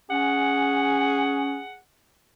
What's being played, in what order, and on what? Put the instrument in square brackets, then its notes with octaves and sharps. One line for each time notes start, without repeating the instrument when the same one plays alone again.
[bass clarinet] C#4 [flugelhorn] G#4 [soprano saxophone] F#5